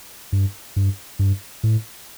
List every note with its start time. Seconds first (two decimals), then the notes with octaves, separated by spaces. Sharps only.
0.32 G2
0.76 G2
1.19 G2
1.63 A2